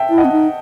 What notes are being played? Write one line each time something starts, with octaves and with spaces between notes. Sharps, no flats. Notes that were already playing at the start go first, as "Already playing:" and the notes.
Already playing: E5 G5 A5
E4
D#5 F#5
C4
D#4